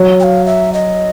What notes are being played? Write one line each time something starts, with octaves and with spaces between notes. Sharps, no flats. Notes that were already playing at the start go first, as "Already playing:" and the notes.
Already playing: F#3
G5
F5
E5
D#5